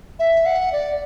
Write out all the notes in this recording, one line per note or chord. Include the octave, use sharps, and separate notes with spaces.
E5
F#5
D5